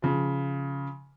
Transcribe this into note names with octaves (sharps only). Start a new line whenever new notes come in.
C#3 F3